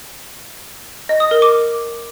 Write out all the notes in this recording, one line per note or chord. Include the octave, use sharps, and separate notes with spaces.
D#5
D#6
A#4
D6